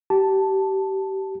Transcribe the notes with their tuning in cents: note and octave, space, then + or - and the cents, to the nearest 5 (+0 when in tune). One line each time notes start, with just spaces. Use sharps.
G4 -25 A5 +0